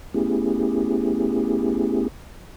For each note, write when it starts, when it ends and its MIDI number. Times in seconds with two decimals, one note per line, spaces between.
0.14 2.08 57
0.14 2.08 59
0.14 2.08 61
0.14 2.08 64
0.14 2.08 67
0.14 2.08 68